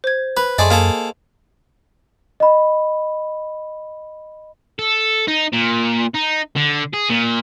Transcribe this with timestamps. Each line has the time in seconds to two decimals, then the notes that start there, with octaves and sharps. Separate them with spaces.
0.04 C5 G#6
0.37 B4 B5
0.58 F#2 A3 G#4 D5 D#5 C6
0.70 A#3 G#4 A4 F5
2.40 D#5 B5
4.79 A4
5.28 D#4
5.53 A#2
6.14 D#4
6.56 D3
6.93 G#4
7.09 A#2